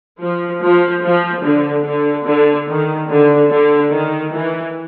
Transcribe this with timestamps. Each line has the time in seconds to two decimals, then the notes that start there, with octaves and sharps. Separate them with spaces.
0.21 F3
0.63 F3
1.04 F3
1.44 D3
1.85 D3
2.27 D3
2.68 D#3
3.10 D3
3.51 D3
3.92 D#3
4.33 E3